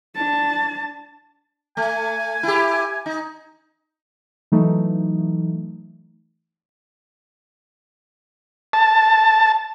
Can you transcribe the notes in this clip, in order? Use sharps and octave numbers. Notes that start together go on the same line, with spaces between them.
D4 A5
A3 G#5
E4 G4
D#4
E3 F#3 A3 D#4
A5